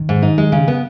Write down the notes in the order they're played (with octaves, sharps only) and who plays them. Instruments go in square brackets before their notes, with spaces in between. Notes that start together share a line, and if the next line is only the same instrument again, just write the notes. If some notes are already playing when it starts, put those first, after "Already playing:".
Already playing: [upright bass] D#3
[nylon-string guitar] G#2
D#4
G#3
C#3
B3